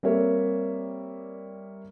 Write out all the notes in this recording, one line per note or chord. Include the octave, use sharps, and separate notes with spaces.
G3 A#3 C4 A#4 C#5 E5